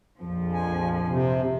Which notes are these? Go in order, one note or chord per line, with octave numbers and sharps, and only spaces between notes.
A#1 F2 F3
G#5
C3